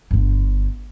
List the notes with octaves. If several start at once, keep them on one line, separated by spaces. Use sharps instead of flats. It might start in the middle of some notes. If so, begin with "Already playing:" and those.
G1 D3